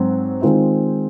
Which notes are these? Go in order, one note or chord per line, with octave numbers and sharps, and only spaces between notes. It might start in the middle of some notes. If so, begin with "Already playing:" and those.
Already playing: G#2 F#3 C4
D#3 G#3 C4 F4 C5